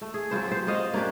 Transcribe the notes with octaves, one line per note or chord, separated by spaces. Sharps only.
A3
G#4
F#3 C4 F4 C5
G4 C5
F4 F#4 D#5 F5
A#3 C#4 D4 G4